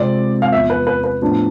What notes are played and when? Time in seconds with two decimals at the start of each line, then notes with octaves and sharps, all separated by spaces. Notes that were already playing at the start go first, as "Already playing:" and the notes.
Already playing: C3 G#3 C4 F4 D5
0.42 F5
0.52 E2 C3 F3 E5
0.70 B4
0.87 B4
1.04 B4
1.22 A2 F3 B3 D4